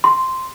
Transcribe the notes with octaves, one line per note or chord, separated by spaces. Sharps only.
C6